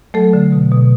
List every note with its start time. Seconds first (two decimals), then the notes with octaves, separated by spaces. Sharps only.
0.14 F#3 A3 A4
0.33 D3
0.52 B2
0.71 B2